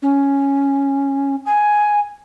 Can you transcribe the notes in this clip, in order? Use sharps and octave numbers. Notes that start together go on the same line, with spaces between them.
C#4
G#5